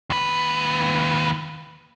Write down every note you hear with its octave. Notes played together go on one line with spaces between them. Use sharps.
D#2 B4